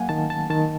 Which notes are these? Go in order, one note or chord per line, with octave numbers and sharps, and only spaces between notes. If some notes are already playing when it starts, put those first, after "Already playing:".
Already playing: F#3 A#3 F5 F#5 G#5
D#3 A5
A5
D#3 A5